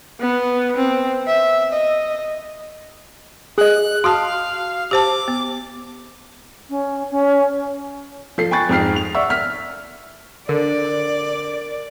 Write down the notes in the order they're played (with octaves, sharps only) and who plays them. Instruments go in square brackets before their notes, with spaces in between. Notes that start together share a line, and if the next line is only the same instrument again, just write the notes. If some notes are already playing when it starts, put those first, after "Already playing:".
[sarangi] B3
C4
E5
D#5
[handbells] G#4 D#5 [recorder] F#6
[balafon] F#4 A5 [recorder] F5 [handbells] C6 D#6 F6
[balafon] G4 C5 A5 [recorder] D6
[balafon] B3
[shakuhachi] C#4
C#4
[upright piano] F3 A4 C7
G5 G#5 B5 C#6 F#6 A6
F2 G#2 G5 F6 C7
F7
D5 E5 F#5 C#6 E6
F6 B6
[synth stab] D3 [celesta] A#4 [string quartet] D5